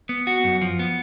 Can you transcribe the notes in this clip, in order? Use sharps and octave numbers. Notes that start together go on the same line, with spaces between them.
B3
F#4
F#2
F3
B3